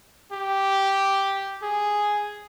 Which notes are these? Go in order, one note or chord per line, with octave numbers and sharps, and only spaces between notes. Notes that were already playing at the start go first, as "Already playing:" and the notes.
G4
G#4